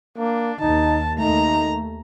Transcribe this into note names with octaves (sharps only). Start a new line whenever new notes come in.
A#3 D4
D#2 D#4 A5
D#2 A3 D#4 A#5